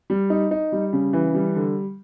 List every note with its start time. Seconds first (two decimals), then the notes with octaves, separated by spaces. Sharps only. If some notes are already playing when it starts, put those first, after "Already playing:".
0.10 G3
0.30 D#4
0.51 D#4
0.72 G3
0.93 C#3
1.13 E3
1.35 G3
1.56 D3